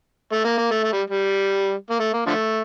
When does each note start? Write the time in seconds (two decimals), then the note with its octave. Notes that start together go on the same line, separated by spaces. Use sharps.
0.32 A3
0.45 A#3
0.58 A#3
0.71 A3
0.84 A3
0.93 G3
1.10 G3
1.90 A#3
2.00 A3
2.13 A#3
2.26 D3 F3 A3